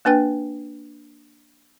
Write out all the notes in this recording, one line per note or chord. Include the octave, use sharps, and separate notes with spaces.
A#3 D4 B4 G5